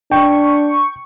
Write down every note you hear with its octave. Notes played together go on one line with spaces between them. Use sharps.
D4 G5 C#6